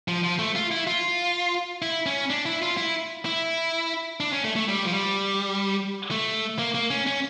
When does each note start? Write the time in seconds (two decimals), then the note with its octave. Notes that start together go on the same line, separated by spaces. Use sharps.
0.08 F3
0.24 F3
0.39 A3
0.55 F4
0.71 E4
0.87 F4
1.82 E4
2.06 C#4
2.30 D4
2.46 E4
2.62 F4
2.77 E4
3.25 E4
4.20 D4
4.33 C#4
4.44 A3
4.56 A3
4.68 G3
4.84 F3
4.92 G3
6.11 A3
6.59 A#3
6.75 A#3
6.91 C#4
7.07 C#4